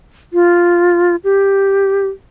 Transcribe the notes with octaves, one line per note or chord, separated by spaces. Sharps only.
F4
G4